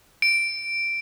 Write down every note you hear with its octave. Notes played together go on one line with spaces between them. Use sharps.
D7